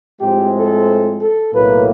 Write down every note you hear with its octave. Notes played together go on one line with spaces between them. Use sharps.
A2 F3 G#3 C4 G4
A4
A4
B1 A2 F#3 A#3 B4